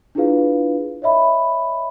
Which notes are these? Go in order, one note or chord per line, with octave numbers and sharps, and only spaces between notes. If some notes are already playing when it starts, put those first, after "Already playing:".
D4 E4 F4 G#4 B4 F5
C#5 D#5 E5 B5